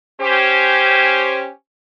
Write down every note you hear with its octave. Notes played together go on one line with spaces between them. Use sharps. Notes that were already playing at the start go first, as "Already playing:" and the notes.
C#4 G4 C5